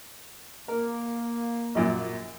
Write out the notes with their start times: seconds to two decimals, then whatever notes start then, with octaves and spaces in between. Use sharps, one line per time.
0.68 A#3 A#4
1.75 A#1 F#2 A#2